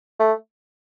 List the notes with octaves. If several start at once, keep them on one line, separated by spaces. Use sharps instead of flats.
A3